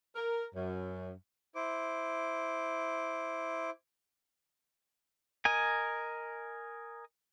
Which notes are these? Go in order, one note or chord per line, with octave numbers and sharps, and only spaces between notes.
A#4
F#2
E4 C5 D6
A#4 D#5 G#5